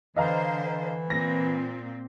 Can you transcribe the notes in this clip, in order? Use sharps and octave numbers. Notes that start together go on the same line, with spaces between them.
D3 E3 C5 D#5 F5 A#5
A#2 C4 A#6